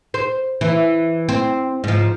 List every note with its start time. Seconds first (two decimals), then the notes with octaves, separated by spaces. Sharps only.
0.14 C5
0.61 E3
1.29 C4
1.84 G#2 F3